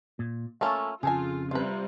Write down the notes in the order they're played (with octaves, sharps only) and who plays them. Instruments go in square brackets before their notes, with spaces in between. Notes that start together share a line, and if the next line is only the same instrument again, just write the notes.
[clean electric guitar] A#2
[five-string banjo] A3 A#3 C#4 [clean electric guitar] F4 A4
[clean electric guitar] F2 C#3 [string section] F4 [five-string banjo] G#4 A4 G#5
[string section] C3 G3 [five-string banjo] F4 B4